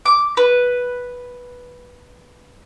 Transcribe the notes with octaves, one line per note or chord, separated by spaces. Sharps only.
D6
B4